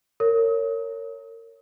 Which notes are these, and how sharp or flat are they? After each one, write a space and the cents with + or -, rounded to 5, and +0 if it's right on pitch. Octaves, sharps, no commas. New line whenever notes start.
A#4 -30 C#5 +0